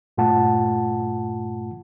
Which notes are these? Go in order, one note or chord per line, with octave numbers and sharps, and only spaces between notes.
G2 A#2 A3 F4 F#5 A5